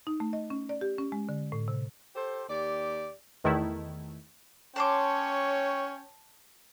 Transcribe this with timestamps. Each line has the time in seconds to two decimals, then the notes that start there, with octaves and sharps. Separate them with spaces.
0.07 D#4
0.20 A3
0.33 D#5
0.50 C#4
0.69 D5
0.81 G4
0.98 C#4
1.12 G#3
1.29 D3
1.52 A2
1.68 C3
2.15 G4 A4 C5
2.49 D#2 G4 D5
3.44 E2 D#3 A3 E4
4.76 C#4 C#5 G5 A5 C6 D6